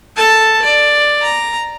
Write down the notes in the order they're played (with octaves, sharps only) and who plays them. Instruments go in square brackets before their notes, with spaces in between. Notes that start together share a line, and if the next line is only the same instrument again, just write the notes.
[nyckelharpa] A4 A5
D5
A#5